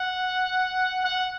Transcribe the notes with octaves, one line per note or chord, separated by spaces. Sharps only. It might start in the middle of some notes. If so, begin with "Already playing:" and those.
Already playing: F#5
F#5